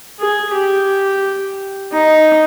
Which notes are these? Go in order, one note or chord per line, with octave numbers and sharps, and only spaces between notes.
G#4
G4
D#4